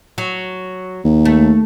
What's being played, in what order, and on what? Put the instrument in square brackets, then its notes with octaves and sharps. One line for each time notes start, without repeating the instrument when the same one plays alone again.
[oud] F#3
[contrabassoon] D#2
[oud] A3